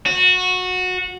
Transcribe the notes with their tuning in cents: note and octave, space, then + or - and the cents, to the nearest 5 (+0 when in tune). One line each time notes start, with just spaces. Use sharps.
F#4 -20